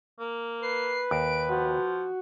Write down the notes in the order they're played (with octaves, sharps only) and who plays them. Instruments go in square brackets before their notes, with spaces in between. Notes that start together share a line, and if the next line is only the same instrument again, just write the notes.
[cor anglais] A#3
[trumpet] B4 [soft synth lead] C7
[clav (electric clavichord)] D#2 [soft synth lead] D7
[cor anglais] F3 [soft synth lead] F#4